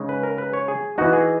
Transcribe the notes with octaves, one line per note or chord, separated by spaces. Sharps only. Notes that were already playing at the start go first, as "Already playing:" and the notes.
Already playing: C#3 G#3 D#4
B4
A#4
B4
C#5
G#4
E3 B3 D#4 F#4
G#4